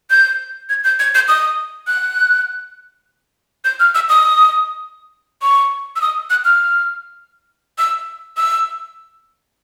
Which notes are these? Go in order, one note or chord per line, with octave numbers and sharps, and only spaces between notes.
G6
G#6
G6
G#6
G6
D#6
F#6
G6
F6
E6
D#6
C#6
E6
D#6
F#6
F6
E6
E6